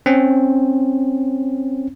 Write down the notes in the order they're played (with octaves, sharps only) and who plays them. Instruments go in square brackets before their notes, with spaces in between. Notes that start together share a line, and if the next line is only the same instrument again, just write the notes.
[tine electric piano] C4 C#4